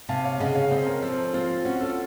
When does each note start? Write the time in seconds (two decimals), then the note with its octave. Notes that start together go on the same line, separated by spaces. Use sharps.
0.09 C3 F5 A5
0.24 C#5 F5
0.40 C#3 D#5 F#5
0.55 C#5 F5
0.71 C4 C5 D#5
0.87 A#4 C#5
1.02 F3 A4 C5
1.33 C4 F4
1.65 C#4 F#4
1.81 F4 A4